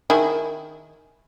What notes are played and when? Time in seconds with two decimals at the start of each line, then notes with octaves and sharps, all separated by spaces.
0.10 D#3 E4 G#4